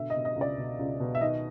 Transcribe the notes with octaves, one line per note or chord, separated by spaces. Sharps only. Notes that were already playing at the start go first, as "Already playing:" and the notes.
Already playing: B2 D3 E5
D#5
B2
D#5
C#2
D5
B2
C#2
B2
E5
D#3 D#5